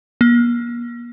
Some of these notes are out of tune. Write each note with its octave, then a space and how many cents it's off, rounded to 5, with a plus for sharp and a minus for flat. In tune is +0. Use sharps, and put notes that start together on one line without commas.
A#3 +40